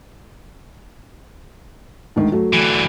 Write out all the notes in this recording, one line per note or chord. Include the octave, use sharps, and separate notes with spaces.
D2 G#2 D#3
F#3 A3
D3 E3